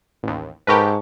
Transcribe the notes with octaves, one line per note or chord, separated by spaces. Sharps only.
A1 D#2
G#2 G4 A#4 B4 A5 C#6